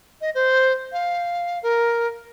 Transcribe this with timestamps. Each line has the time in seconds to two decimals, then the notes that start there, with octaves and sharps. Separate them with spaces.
0.21 D#5
0.35 C5
0.92 F5
1.63 A#4